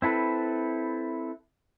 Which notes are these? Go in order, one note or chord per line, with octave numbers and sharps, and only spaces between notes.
C4 E4 A4 B4